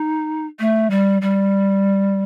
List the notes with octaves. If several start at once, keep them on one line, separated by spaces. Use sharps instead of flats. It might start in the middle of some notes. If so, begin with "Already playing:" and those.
Already playing: D#4
A3
G3
G3